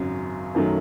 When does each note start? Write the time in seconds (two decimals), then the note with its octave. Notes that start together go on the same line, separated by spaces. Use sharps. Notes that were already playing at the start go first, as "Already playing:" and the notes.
Already playing: G#1 F#2 C#3 F#3
0.55 F#2 D#3 F#3 A3